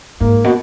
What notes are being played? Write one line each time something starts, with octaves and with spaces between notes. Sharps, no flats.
G#2 A#3
B2